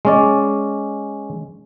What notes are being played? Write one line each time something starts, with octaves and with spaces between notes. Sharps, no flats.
G#3 C#4 D5